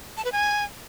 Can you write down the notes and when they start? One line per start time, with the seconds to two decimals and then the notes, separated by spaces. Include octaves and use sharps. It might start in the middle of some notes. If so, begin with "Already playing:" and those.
0.17 A5
0.25 B4
0.32 G#5